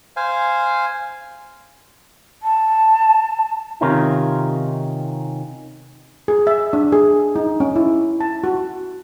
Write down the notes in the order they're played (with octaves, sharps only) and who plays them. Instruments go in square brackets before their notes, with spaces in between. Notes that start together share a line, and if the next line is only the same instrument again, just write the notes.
[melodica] C5 F5 G#5
[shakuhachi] A5
[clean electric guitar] C3 D#3 C#4 D#4 F4
[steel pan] G#4
E5
D4
G#4
D#4
C#4
E4
A5
F#4